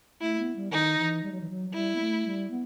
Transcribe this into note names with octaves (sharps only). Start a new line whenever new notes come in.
A3 E4
B3
G3
D#3 D#4
E3
G3
F#3
E3
F#3
F#3
G3 E4
B3
A3
G3
B3